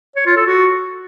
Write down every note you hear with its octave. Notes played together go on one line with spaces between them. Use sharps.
C#5
F4
A4
F#4